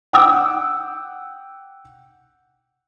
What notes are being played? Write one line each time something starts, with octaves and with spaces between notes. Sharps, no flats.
F#5 G5 D6 E6